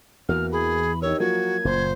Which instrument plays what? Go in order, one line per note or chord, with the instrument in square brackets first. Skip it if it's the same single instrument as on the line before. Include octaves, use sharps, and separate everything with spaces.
[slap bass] E2 E3 [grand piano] A#3 F#4 [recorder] F6
[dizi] G#4 [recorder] B5
[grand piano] D#4 G4 A#4 [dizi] C#5 [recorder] E6
[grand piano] F3 F#3 A#3 [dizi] F#4 [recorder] G#6
[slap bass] F#1 [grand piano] A#2 [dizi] C5